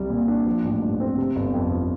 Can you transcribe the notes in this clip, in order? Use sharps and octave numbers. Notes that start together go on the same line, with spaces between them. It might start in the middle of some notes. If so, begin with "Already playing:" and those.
Already playing: C2 G3
A#2
D4
F3
A1
G2
C4
C3
G1
F2
F3